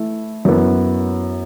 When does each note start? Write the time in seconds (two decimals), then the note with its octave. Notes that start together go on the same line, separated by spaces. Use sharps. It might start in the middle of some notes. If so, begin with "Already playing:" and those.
Already playing: E3 A3 E4
0.45 F#2 E3 B3